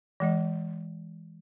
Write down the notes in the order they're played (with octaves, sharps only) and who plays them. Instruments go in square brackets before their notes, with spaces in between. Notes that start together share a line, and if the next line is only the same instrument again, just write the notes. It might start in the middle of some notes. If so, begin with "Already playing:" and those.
[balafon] E3 G#3 D#5